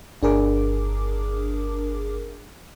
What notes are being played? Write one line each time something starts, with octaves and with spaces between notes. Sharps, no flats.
G1 D4 G#4 A#4 D6